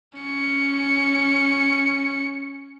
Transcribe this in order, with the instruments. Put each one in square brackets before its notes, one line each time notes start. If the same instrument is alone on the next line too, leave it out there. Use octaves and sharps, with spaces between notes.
[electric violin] C#4 C#7